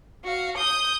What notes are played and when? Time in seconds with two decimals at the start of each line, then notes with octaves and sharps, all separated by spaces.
0.25 F#4 F5
0.57 D#6 G6